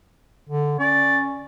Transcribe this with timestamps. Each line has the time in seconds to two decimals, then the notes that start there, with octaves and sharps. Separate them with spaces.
0.49 D3
0.79 C#4 D5